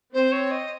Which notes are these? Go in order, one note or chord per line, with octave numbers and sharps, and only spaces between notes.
C4 C5
C#5
D#5